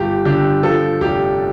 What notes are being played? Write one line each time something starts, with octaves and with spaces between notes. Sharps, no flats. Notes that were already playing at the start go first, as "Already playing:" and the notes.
Already playing: G1 G4
D3 G4
F3 A4
F1 G4